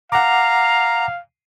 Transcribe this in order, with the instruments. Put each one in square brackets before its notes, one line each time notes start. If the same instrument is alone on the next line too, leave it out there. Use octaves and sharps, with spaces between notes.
[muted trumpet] F5 [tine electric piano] F#5 D6 [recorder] A#5